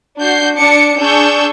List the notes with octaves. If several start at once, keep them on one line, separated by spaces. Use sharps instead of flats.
D4 F#4 G6 C7
D4 D6 C#7
D4 G#4 C#6 E6 G6